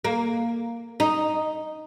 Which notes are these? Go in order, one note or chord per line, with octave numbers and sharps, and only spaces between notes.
A#3
D#4